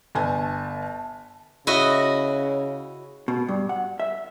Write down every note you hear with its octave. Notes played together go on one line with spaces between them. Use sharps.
G1 G#5 A5
C#3 E4 F#4 D#5
B2
G2
F#5
E5